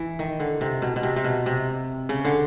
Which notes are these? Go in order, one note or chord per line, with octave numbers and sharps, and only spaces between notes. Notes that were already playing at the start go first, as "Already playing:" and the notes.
Already playing: E3
D#3
D3
C3
B2
B2
C3
C3
B2
C3
C#3
D3